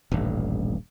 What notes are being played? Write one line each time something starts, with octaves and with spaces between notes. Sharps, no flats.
D#1 A1 G2